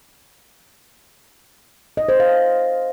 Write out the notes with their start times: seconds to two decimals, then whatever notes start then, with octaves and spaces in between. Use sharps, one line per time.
1.97 D#5
2.09 C5
2.20 F5